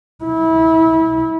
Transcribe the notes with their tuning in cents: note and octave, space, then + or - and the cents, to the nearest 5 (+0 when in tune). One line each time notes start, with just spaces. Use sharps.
E4 -25